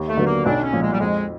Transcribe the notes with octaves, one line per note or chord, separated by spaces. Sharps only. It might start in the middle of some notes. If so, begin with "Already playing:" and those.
Already playing: D#2
A3
D3 F#3 B3
A#3
B1 D4
C#4
A#2 F3
G#3
G3
F2 G#3